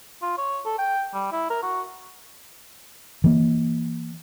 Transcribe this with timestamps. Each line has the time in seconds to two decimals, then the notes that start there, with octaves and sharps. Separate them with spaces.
0.22 F4
0.38 C#5
0.65 A4
0.78 G5
1.14 G3
1.32 E4
1.50 A#4
1.63 F#4
3.24 E3 A#3